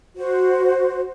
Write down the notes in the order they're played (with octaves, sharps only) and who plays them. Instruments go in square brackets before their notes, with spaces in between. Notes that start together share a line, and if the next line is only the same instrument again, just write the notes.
[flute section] F#4 C5